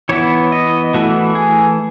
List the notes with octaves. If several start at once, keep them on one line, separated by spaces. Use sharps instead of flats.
E3 B3 E4 C#5
D#5
E3 A3 E4 F#4
G#4